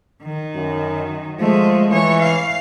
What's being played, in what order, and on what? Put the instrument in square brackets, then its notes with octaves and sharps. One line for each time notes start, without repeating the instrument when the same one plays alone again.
[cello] D#3
[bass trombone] F#2
[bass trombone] F3 [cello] G#3 A3
[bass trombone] E3 [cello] C#5
[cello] F5